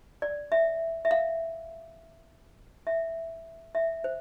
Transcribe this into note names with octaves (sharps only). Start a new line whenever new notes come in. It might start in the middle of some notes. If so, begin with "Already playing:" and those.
D5
E5
E5
F5
E5
E5
C5